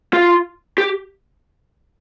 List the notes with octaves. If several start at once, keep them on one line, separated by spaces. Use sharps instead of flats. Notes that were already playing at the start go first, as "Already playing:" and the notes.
F4
G4